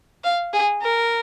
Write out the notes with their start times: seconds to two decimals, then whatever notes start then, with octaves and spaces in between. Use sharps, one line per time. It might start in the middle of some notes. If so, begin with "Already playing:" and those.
0.24 F5
0.53 G#4
0.82 A#4